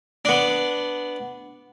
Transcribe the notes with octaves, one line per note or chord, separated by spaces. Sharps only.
B3 D4